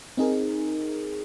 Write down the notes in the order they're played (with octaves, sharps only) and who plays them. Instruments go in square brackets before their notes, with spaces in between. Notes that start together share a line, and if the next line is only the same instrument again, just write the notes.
[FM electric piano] C4 D#4 G#4 A#4